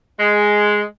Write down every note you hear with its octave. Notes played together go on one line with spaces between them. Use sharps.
G#3